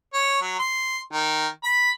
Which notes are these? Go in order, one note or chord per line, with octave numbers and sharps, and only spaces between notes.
C#5
F#3
C6
D#3
B5